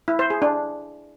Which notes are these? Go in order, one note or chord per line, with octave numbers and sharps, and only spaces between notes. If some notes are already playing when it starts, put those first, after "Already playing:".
E4
C5
G#4
D4